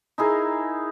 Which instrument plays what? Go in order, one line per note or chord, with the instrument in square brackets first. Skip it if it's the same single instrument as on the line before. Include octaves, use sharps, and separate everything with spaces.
[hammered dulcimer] D#4 E4 G#4 A#4